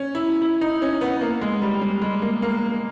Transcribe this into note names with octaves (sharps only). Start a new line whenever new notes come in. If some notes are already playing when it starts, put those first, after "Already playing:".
Already playing: C#4
E4
E4
D#4
C#4
B3
A#3
G#3
G3
G3
G#3
A#3
A#3